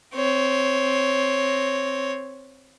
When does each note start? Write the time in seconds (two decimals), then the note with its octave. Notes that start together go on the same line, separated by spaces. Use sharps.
0.14 C4 C#5